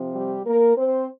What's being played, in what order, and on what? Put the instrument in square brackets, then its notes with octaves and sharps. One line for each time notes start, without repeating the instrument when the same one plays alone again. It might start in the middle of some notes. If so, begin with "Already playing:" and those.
Already playing: [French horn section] C3 F3 C4
G3 G4
A#3 A#4
C4 C5